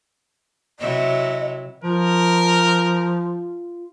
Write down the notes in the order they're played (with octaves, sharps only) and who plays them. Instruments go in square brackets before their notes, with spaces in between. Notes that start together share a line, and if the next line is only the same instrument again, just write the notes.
[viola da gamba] C3 F#3 E4 [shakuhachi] D#5
[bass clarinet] F3 [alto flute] F4 [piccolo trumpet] A#4